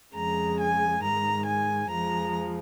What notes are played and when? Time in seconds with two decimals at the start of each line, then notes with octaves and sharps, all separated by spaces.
0.14 F2 C#3 G#3 A#5
0.58 G#5
1.02 G#2 D#3 G#3 A#5
1.46 G#5
1.89 F2 F3 G#3 A#5